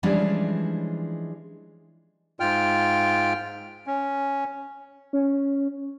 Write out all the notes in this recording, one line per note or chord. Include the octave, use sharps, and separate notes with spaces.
E3 F3 G3 G#3 C#4 D4
G#2 F4 G5 F6
C#4
C#4